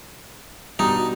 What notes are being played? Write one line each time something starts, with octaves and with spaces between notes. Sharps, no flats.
G2 B2 D#4